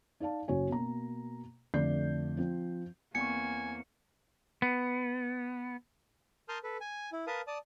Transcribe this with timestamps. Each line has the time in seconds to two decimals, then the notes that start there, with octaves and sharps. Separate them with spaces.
0.20 D#4 D5 F5 A5
0.48 F#1 F#4 C#5 G#5
0.69 B2 A#3 A#5
1.74 F2 D3 A3 D5 G6 C7
2.37 F3 C4
3.15 E2 A#3 C4 G#5 C#6 C#7
4.62 B3
6.49 A#4 A5 C6 D#6 F6 G6
6.64 A4 B4
6.81 G#5
7.13 E4
7.27 A#4 B4 F5 A5 D#6
7.47 D5 A5 D#6